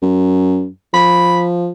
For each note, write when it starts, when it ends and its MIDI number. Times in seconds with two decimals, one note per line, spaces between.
0.02 0.67 42
0.94 1.70 53
0.94 1.41 83